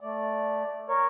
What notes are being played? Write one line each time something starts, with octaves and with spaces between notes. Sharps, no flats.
A3 D5
A#4 C#5